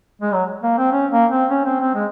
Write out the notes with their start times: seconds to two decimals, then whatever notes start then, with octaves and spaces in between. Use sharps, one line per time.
0.22 G#3
0.33 F#3
0.63 A#3
0.78 C4
0.92 C#4
1.12 A#3
1.31 C4
1.50 C#4
1.65 C4
1.81 C4
1.95 G#3